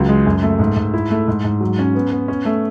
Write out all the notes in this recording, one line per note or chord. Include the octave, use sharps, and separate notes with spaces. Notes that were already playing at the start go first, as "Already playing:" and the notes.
Already playing: C#2 F#3
G#3
F#2
A3
G#2
G#2
E4
A3
G#2
G#2
F#3
C#4
B3
B3
C#4
A3